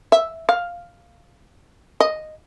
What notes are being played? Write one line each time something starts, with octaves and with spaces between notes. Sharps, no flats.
E5
F5
D#5